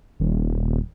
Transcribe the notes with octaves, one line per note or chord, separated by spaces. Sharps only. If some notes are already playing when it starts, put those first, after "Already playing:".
D#1